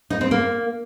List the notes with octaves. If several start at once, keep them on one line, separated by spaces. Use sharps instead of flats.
D#4
C4
A#3